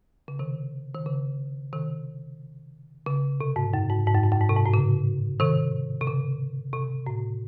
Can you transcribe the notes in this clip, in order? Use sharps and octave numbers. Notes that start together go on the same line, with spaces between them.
C#3
C3 D#3
D#3
C#3
C3 D#3
C#3
C3
G#2
F#2
G#2
G#2
F#2
G#2
F#2
G#2
C3
G#2
A2
C#3
C3 D#3
C3
C#3
C3
A2